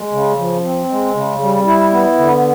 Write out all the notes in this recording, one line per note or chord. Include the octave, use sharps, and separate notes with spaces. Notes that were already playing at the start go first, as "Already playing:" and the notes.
Already playing: G#3
C#3
F3
C4
G#3
C#3
G3
E4
B3
D3